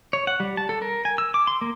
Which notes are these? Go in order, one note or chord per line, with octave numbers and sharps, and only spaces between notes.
C#5
F#5
G3
A5
A4
A#4
G#5
E6
D6
C6
A#3